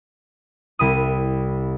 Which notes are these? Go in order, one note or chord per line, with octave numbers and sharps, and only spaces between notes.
C2 E4 D#6